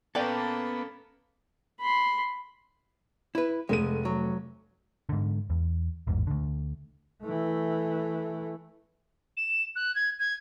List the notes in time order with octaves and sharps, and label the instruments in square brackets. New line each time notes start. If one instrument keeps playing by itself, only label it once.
[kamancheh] A#3 A5 [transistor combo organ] B3 [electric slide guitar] C#4 A4 [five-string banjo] B4 D5 G5
[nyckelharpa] B5 C6
[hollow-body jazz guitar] E4 B4
[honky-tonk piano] F1 A3 D#7 [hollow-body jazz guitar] G#3
[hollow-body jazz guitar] F#3
[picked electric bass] G#2 D3
E2
A1 E2 G#2
D2 D3
[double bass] E3 A3
[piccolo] E7
F#6
G#6
G#6